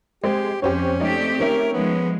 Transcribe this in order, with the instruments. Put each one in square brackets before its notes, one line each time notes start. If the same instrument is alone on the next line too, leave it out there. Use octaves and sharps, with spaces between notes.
[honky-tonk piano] G#3 C4 G#4 [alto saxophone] G4
[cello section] F2 [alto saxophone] C#4 [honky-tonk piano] G4 C5 C#5
[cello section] A3 C4 G4 [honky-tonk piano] D#4 D5
[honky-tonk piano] D#3 C#4 E5 [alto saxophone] A#4
[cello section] F3 G#3 [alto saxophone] B3